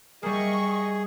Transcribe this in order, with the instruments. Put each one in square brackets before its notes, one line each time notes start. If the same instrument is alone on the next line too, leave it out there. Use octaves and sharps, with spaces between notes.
[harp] G3 A#3 [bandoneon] G#4 [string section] D#5 E5 C#6